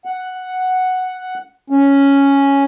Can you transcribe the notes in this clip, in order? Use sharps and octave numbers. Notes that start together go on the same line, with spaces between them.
F#5
C#4